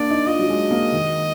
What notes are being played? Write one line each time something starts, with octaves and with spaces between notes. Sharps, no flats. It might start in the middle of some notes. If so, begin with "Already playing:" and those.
Already playing: A#3 D4 D5
D#4
F4 D#5
F#3
G#3
A#3
D#3